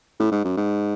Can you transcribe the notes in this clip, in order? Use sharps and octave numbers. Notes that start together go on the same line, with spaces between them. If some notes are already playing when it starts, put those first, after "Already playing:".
A2
G#2
F#2
G#2